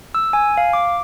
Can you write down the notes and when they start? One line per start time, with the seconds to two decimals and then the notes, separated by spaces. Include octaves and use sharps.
0.15 E6
0.33 G#5
0.57 F5
0.73 D6